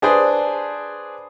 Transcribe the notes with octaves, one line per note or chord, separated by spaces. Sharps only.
D4 G#4 B4 C5 D5